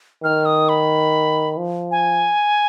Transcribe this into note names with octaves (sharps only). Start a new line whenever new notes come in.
D#3 F6
D#6
B5
F3
G#5